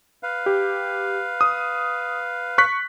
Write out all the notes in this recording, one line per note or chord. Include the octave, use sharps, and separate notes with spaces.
B4 F5
G4
D#6
C#6 F#6 B6